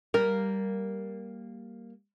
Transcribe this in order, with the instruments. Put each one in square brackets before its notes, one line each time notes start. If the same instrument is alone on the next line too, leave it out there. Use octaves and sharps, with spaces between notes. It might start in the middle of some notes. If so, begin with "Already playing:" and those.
[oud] G3 A#3 [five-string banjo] A#4